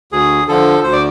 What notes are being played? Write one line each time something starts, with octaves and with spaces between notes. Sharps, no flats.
D2 G#4
D3 F3 A4
D2 C5
D5